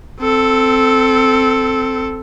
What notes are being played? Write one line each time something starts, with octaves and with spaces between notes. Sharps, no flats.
C4 A4